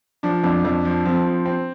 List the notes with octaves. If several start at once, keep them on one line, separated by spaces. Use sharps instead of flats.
F3 D4
F2 D4
F2
F3
F3 C4
F3
C4